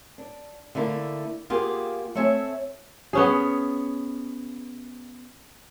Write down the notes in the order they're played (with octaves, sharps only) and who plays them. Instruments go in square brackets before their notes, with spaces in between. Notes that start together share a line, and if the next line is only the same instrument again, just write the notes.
[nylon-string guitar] D4
D3 A3 A#3 E4
A#3 B3 F4 G4 G#4
A3 C4 C#5 E5 G#5
[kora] B3 C#4 G#4